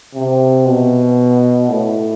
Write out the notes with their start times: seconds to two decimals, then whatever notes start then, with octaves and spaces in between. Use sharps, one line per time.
0.14 C3
0.65 B2
1.69 A2